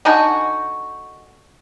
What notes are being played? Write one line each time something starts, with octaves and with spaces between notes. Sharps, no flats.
D3 D#4 F#4 G#5